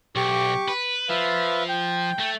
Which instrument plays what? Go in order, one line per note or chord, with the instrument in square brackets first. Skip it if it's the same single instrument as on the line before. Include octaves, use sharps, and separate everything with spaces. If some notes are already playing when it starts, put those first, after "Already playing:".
[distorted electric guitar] B1 [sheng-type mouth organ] G4 C#6 D6
[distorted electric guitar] B4
[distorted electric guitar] F3 [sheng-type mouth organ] B4 E5 F5
[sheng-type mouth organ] G5
[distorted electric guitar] A3